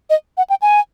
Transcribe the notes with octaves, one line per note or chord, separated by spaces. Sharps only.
D#5
F#5
G5
G#5